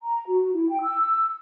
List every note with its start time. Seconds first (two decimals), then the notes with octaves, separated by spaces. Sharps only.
0.01 A#5
0.27 F#4
0.53 E4
0.69 G5
0.82 E6